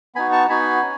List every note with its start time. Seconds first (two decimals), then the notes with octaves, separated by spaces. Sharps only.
0.15 B3 D#4 F#4 G#5 B5
0.32 A5 C#6
0.49 B3 D#4 F#4 G#5 B5
0.82 C#4